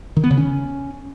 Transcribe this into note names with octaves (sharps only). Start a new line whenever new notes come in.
D#3
B3
C#3
C#4